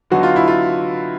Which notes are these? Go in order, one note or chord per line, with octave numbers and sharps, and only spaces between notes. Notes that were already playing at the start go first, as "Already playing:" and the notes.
D3 F#3 B3 D#4 F#4
F4
E4
F4